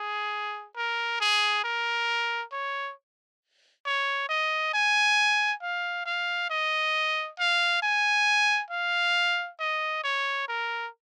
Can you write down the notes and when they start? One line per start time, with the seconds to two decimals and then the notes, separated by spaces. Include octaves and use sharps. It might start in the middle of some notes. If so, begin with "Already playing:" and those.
Already playing: G#4
0.76 A#4
1.20 G#4
1.64 A#4
2.52 C#5
3.85 C#5
4.29 D#5
4.74 G#5
5.62 F5
6.06 F5
6.50 D#5
7.39 F5
7.82 G#5
8.70 F5
9.59 D#5
10.04 C#5
10.48 A#4